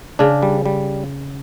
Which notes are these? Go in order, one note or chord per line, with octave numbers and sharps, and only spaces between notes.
C#3 D4
G3
G3